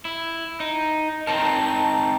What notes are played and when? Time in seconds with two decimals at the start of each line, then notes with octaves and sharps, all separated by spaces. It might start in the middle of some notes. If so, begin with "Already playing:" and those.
0.05 E4
0.60 D#4
1.27 C4 D#4 A#4 A5